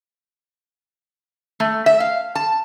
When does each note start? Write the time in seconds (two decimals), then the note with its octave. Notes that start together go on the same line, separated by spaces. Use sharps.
1.60 A3
1.86 E5
2.00 F5
2.35 A5